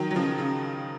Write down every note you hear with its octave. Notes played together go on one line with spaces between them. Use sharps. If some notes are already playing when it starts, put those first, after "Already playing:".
Already playing: D#3 F#3
F#3
C#3 F3
C#3